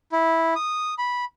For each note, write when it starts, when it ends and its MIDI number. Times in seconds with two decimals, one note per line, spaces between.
0.12 0.54 64
0.56 0.94 87
0.98 1.25 83